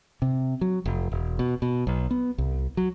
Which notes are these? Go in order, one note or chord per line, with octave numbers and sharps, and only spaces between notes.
C3
F#3
F1
E1
B2
B2
B1
B3
C2
F#3